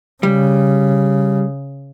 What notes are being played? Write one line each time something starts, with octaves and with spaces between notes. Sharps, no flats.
C#3 G3